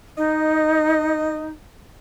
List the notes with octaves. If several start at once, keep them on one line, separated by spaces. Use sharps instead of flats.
D#4 D#5